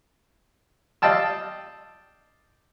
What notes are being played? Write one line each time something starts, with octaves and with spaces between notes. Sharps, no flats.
D5 D#5 F5 G5 A5 E6